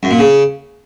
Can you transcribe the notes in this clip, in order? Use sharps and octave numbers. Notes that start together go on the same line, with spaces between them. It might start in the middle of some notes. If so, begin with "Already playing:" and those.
F#2
A#2
C#3